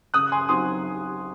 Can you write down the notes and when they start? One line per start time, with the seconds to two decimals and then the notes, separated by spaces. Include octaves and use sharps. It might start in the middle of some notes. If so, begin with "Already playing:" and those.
0.14 C#3 D#6 F#6
0.32 G#5 C6
0.49 F#3 C4 D#4 C6 D#6